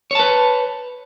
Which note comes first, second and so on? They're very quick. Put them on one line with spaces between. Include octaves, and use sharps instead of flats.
C#5 A5 B4